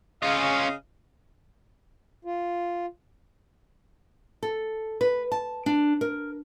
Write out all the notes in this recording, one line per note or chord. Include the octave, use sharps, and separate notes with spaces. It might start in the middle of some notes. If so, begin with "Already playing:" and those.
C#3 C#4 F4 D#5 F5
F4
A4
B4
A5
D4
A#4